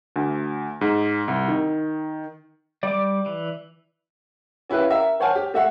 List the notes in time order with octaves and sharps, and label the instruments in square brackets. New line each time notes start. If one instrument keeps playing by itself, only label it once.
[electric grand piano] D2
G#2
C2
D#3
[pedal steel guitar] G3 D6 [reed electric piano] D5
[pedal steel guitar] E3
[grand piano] C#4 E4 G4 B4 F5
A#4 E5
C5 C#5 F#5 G#5 A5 F6
G4
A3 E5 F#5